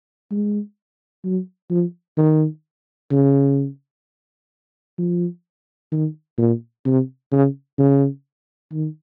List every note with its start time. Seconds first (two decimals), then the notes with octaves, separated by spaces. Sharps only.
0.31 G#3
1.24 F#3
1.70 F3
2.17 D#3
3.11 C#3
4.98 F3
5.92 D#3
6.38 A#2
6.86 C3
7.32 C#3
7.78 C#3
8.72 D#3